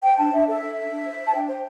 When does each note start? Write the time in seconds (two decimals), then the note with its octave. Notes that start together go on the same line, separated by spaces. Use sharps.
0.04 C5 G5
0.18 D4 A5
0.32 D4 E5
0.48 A4 E5
0.61 A4
0.76 D4
0.90 D4
1.06 C5
1.19 C5
1.28 A5
1.34 D4 G5
1.48 C5